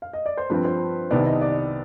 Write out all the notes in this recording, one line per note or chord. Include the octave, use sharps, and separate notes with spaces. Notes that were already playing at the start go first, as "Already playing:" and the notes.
F5
D#5
D5
C5
G2 F3 C4 B4
C5
C2 C3 D#3 B3 D5
D#5
D5